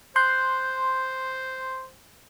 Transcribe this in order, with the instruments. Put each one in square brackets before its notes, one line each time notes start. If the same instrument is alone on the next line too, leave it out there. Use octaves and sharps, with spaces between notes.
[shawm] C5 [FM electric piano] C6 [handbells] F#6 G6